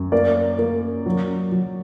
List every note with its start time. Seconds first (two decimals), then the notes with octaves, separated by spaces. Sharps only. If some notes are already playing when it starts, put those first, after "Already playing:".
Already playing: F#2
0.12 A#3 D5
0.59 A#3
1.06 F#3
1.52 F#3